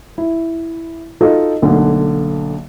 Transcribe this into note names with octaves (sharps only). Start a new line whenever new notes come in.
E4
D#4 F4 F#4 A4 D#5
B1 D3 A3 A#3